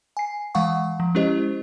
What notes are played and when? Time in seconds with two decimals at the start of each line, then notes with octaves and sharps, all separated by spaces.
0.17 G#5 C7
0.55 E3 G#3 F5 F#5 C#6
1.00 F3
1.15 G#3 C#4 E4 G4 C5 D#5